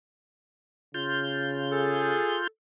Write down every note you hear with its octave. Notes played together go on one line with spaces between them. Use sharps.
C#3 F4 G6
G#4 A4